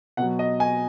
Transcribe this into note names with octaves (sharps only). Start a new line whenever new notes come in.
B2 F#3 F#5
D#5
G#5